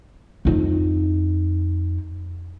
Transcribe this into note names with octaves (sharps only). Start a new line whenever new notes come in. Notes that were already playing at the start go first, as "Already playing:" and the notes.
F2 D#4